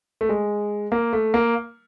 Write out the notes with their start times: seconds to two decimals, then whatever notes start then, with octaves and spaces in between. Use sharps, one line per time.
0.21 A3
0.29 G#3
0.92 A#3
1.13 A3
1.34 A#3